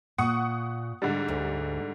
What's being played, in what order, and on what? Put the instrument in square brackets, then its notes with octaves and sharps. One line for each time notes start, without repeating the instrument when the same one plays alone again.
[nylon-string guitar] A#2 [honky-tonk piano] F#5 C#6 D#6
[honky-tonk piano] G#2 D3 G3
[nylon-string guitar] D2